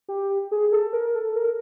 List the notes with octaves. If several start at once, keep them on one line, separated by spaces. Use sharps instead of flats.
G4
G#4
A4
A#4
A4
A#4